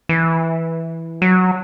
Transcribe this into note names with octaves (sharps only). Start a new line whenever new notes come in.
E3
F#3